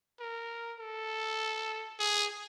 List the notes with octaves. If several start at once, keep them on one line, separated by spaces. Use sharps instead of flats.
A#4
A4
G#4